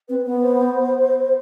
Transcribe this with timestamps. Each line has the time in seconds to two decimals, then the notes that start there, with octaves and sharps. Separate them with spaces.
0.09 C4 B4
0.25 B3 B4
0.41 C5